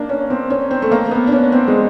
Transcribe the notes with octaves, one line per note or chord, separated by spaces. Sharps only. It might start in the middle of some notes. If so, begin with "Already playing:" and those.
Already playing: A#3 D4
C#4
C4
C#4
C4
A3
A#3
B3
D4
C#4
C4
G#3